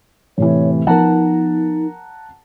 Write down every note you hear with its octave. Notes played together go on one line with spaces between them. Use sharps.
A2 C3 E3 C#5
F3 B3 D#4 A#4 F#5 A5 A#5